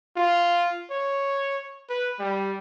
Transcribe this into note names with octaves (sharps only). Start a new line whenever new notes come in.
F4
C#5
B4
G3